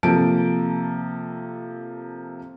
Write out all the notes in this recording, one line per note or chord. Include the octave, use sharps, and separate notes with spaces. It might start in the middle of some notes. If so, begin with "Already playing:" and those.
C3 F3 A#3 A4 A5 D7